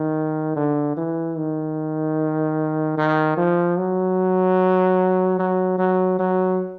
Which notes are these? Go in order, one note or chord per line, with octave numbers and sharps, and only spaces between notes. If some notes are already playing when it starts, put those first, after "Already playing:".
Already playing: D#3
D3
E3
D#3
D#3
F3
F#3
F#3
F#3
F#3